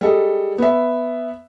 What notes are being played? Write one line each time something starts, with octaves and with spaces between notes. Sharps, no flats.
G3 G#3 A4 D#5
B3 E5